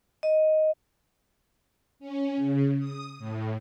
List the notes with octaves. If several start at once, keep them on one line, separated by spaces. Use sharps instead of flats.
D#5
C#4
C#3
D#6
A2